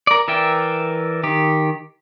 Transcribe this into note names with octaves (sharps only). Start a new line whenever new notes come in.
A#4 D5
E3 A#4 D5 E5 G5
D#3 G4